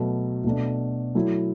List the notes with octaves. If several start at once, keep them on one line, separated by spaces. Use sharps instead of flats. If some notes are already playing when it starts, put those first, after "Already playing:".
Already playing: B2 F#3 A3
B2 A3 D4
F#3 A3 E4